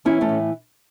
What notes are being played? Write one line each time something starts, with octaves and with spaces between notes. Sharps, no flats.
E3 C#4 E4
A3 C#4
A2